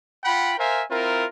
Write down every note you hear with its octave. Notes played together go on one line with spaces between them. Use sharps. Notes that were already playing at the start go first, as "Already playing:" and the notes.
F4 F#5 G5 B5
A#4 C5 E5 F5 G#5
C4 E4 F4 A#4